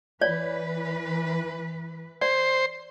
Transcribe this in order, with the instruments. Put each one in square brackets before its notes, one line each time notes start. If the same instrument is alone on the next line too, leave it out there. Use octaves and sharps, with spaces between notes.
[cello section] E3 B4 [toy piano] C#5 D5
[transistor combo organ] C5 [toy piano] D5